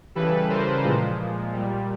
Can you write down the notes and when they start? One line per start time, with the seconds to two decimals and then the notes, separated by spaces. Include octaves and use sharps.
0.15 C#3 E3 G3 A4 B4
0.50 A#4 C5
0.84 A#2 F3 G#3
1.53 A#2 G3